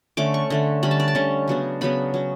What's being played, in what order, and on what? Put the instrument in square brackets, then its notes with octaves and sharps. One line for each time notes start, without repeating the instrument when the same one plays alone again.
[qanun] D3 A3 C#4 D6
C#6
D3 A3 C#4
D3 G3 C#4 B5
A5
D5
A5
D3 G3 C#4
C#3 F#3 B3 D4
C#3 F#3 B3 D4 B5
F#3 C#4